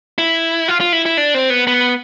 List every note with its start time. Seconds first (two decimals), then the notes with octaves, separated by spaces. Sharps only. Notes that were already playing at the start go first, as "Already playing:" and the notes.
0.18 E4
0.68 F4
0.80 F4
0.93 E4
1.06 E4
1.17 D4
1.34 C4
1.50 B3
1.67 B3